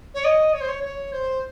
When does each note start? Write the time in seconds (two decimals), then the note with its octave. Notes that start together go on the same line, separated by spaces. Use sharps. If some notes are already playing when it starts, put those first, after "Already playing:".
0.14 C#5
0.24 D#5
0.53 C#5
0.61 C5
0.68 C#5
0.83 C#5
1.12 C5